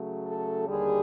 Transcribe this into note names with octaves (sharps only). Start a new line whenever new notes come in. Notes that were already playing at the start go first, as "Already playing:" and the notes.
Already playing: C#3 F#3 A3
A4
D#2 D3 G3 G#4